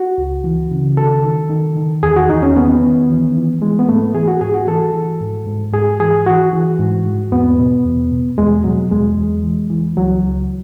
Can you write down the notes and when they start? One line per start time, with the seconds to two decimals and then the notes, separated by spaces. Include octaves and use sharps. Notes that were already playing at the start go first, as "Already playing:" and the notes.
Already playing: F#4
0.18 C#2
0.44 E3
0.71 C#3
0.97 D#3 A4
1.24 D#3
1.50 D#3
1.77 D#3
2.03 E2 G#4
2.16 F#4
2.30 E2 D#4
2.43 C#4
2.56 D#3 B3
2.83 D#3
3.09 E3
3.36 E3
3.61 E3 G#3
3.79 B3
3.89 G#2 A3
4.15 E3 G#4
4.28 F#4
4.41 G#2 G#4
4.54 F#4
4.67 E3 A4
4.94 E3
5.20 G#2
5.46 G#2
5.73 G#2 G#4
6.00 E3 G#4
6.26 E3 F#4
6.53 E3
6.79 G#2
7.06 G#2
7.32 E2 B3
7.59 B2
7.85 E2
8.12 B2
8.38 E2 G#3
8.64 B2 F#3
8.91 E2 G#3
9.18 E2
9.44 E3
9.70 E3
9.97 C#2 F#3
10.23 C#2